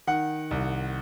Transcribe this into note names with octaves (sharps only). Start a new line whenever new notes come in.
D#3 F#5
C2